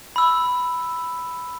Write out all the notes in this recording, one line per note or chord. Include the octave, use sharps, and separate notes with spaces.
B5 E6